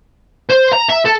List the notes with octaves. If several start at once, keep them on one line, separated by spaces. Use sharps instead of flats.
C5
A#5
E5
A4